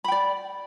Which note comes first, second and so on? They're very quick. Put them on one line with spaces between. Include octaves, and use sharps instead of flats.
B5 G5 D5